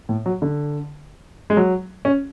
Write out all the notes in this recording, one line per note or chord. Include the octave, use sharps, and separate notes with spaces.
A2
F#3
D3
G#3
F#3
C#4